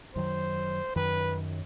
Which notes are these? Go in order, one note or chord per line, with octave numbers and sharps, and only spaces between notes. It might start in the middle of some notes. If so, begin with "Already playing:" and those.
F#2 D#3 F#3 C5
F#2 D#3 F#3 B4